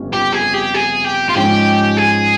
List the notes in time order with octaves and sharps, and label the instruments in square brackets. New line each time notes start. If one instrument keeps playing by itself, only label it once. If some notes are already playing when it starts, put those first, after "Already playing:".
Already playing: [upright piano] G1 F2 C#3 G3 C#4
[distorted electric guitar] G4
G#4
G4
G#4
G4
F4
[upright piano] G#2 F3 G#3 C#4 [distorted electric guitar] G4
[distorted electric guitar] G#4